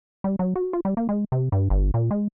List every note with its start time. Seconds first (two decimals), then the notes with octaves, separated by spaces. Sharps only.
0.24 G3
0.39 F#3
0.56 F#4
0.73 F4
0.85 G3
0.97 A#3
1.09 G#3
1.32 C3
1.52 G2
1.70 G1
1.94 A#2
2.11 G#3